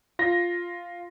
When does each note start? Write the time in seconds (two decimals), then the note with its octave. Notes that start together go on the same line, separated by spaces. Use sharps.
0.19 F4 A#6